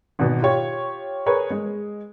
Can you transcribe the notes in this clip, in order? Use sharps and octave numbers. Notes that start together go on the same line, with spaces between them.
G#1 B2
F4 G4 C#5
G#4 A#4 B4 C#5
G#3